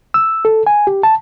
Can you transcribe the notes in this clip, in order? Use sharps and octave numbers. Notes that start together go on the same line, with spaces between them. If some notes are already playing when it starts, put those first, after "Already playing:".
E6
A4
G#5
G4
A5